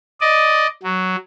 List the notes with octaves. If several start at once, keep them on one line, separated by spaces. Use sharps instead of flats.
D5 D#5
F#3